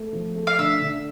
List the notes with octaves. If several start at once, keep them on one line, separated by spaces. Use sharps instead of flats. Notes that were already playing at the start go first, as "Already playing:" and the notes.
Already playing: A3
F3
A3
F5
D3 E5
D3